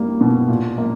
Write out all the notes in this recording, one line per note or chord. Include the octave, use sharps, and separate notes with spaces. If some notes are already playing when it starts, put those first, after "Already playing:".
Already playing: G3 A#3
B2
A#2
A#3